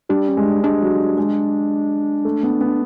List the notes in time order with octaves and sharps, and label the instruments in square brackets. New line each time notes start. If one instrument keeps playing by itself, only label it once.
[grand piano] G3 [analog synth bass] D4
[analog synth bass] C#4
[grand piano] G#3
[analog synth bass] D4
[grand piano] G#3 [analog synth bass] D4
[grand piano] F#3
G#3
A3
B3
B3